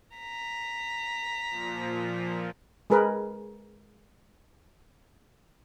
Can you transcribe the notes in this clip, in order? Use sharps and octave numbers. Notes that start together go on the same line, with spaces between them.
A#5 B6
A#2 F3
G#3 G#4 A#4 B4